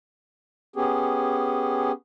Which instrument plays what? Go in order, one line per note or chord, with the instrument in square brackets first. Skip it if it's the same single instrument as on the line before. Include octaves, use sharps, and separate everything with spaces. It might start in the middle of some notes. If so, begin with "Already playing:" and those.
[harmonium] B3 C#4 G4 G#4